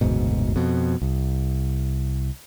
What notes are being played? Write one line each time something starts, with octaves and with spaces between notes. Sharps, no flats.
F#1 D2 G#2 B2
F2 B2
C2